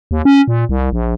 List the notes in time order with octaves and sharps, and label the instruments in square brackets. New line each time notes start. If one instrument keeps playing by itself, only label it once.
[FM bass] D#2
C#4
A#2
C2
A#1